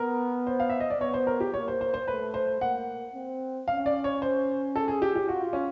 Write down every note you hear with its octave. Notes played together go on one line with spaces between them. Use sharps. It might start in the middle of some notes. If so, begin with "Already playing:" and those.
Already playing: B3 A#4
C5
F5
E5
D#5
D5
B3 C#5
C5
A#4
G4
A#3 C#5
C5
C5
C5
A3 B4
C5
A#3 F#5
C4
C#4 F5
D5
C#5
C5
A4
G#4
G4
G4
F4 F#4
C#4